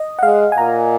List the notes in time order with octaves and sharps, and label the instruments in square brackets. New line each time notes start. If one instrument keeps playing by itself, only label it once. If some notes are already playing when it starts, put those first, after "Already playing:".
Already playing: [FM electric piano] D#5
F#5
[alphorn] G#3 [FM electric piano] F5
[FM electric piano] G#5
[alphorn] A#2 [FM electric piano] A#5